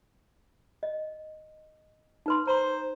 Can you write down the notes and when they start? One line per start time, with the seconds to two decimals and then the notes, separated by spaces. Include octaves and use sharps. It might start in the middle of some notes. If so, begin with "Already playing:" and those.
0.83 D#5
2.26 D#4 B4 C6
2.47 C5 A#5 C6